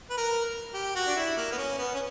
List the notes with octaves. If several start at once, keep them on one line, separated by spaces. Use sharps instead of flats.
B4
A#4
G4
F#4
D4
E4
A#3
B3
C#4
B3
C#4